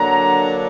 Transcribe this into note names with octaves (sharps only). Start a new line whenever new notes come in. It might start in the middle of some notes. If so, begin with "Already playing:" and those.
Already playing: D3 F#3 A#3 D4 A#5